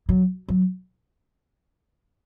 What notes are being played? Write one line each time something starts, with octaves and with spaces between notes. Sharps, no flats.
F#3
F#3